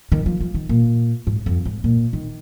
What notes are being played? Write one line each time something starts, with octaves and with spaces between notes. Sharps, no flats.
D#3
F3
F3
D#3
A#2
G#2
F2
G#2
A#2
D#3